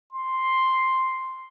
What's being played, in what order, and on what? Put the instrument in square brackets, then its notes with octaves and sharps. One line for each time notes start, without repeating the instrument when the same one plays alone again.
[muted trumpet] C6